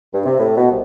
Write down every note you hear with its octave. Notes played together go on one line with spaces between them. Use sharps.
G2
C3
A2
B2
C2